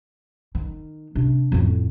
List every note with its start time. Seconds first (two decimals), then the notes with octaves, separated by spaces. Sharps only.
0.55 D#3
1.15 C3 D4
1.52 F2 A2